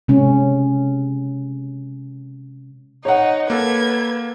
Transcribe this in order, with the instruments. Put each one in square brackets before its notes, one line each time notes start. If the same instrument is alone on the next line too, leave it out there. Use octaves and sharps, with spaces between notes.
[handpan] C3 G#3 C#4
[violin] D#4 [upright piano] C#5 F#5
[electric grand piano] A#3 A4 [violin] B4 G#6